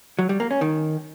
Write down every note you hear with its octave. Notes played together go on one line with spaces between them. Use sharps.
F#3
G3
A#3
C#4
D#3